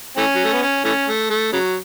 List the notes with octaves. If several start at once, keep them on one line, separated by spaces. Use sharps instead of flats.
E3 A3 C#4
F#3
A3
B3
C#4
E3 A3 C#4
A3
A3
C#3 F#3